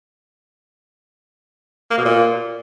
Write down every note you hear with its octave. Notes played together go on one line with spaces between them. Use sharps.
A#3
B2
A#2